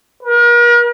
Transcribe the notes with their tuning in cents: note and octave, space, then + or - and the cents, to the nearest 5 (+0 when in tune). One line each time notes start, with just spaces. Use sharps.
A#4 +40